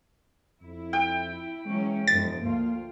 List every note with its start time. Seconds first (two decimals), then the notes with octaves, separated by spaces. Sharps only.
0.62 F2 E4
0.93 G5
1.65 E3 F#3 G#3 C#4
2.07 E1 F#2 F3 G#3 A6
2.41 D2 A#3 F4